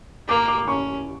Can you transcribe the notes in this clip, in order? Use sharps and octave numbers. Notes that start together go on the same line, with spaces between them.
A#3 D6
D6
D6
C#4 C#6